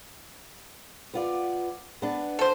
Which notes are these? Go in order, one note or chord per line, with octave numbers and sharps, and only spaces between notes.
B3 F4 D5
B3 D4
A4 C5